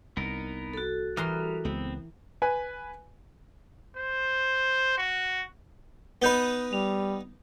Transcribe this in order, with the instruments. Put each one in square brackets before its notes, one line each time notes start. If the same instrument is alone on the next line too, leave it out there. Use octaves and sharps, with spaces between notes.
[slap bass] C2 [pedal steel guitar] B3 D#4 A#4
[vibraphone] F#4 A4
[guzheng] E3 A#4 C6 [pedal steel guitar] G3 D#6 F6
[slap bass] C#2 G#3 [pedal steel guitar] B3 C4
[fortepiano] B4 G#5
[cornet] C5
F#4
[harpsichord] B3 D#4 B4 [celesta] B5 G6 G7
[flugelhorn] G3 [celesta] F7